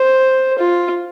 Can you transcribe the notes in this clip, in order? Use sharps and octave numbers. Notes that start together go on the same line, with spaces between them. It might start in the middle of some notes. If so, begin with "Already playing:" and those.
Already playing: C5
F4